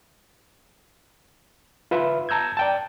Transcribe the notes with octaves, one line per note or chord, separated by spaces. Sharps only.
F4 B4 E5 F5
A5 A#5 E6 G6 G#6
D5 G5 A5